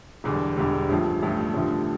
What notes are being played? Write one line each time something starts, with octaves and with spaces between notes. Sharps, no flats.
E1 E2 D3 G3
E1 E2 D3 G3
A1 G2 F3 A3
A1 G2 F3 A3
A1 G2 D3 F3 A3